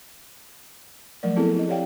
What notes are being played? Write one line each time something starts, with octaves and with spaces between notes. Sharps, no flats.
F3 F#3 A3 A#4 D5
B3 C4 E4 G#4 A4
E4 D#5
G4 C#5 D5 F5 G5